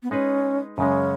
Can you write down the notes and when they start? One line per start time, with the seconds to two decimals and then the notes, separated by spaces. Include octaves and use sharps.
0.03 B3
0.11 G#3 C#4 D#4 G#4 B4
0.78 F#2 C#3 G#3 C#4